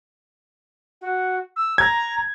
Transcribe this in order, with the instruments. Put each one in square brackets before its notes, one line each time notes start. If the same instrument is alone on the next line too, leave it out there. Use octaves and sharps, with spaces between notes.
[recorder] F#4
E6
[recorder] A#5 [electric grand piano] G#6